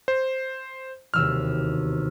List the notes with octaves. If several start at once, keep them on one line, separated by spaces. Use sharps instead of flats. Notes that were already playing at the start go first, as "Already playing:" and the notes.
C5
E1 D#2 C3 E6 F6